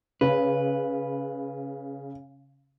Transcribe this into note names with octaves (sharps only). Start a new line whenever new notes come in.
C#3 B4